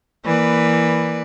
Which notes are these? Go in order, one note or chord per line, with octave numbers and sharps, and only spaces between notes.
E3 A#3 B4 D5